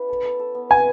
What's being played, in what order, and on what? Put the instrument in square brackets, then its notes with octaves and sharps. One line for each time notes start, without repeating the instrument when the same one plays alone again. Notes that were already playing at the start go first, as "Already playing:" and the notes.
Already playing: [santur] B3 C#4 E4 B4
A4
A4
A4
B3
[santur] B4 [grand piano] G#5